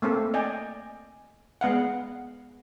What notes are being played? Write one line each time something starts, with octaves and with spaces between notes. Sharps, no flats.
A3 A#3 C4 A4
D5 D#5 G5 G#5
G#3 B3 F5 F#5